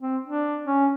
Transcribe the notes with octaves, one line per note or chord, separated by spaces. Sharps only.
C4
D4
C#4